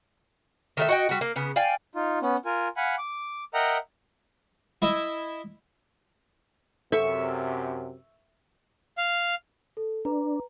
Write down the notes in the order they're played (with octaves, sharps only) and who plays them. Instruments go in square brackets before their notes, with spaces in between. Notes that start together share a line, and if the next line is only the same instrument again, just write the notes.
[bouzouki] D#3 A3 E5
F#4 D#5 G5
G3 F#4
A#3
C#3 B3
D5 F5 G5 G#5
[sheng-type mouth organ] D#4 F4
B3 C#4
F4 A#4 G#5
F5 F#5 G#5 B5
D6
A#4 D#5 E5 F#5 G5 A#5
[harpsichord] E4 D#5 E5
[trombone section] F#2 C3 [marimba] A4 [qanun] E5 C#6
[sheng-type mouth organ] F5
[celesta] A4
[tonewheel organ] D4 [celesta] B4 A#5